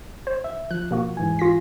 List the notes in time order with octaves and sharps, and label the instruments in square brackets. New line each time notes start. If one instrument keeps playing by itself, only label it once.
[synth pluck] C5
[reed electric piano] E5
[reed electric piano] F3 [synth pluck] F#6
[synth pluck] B2 A#3 F#4
[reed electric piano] G#2 E3 G#5
[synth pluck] F4 A#6 B6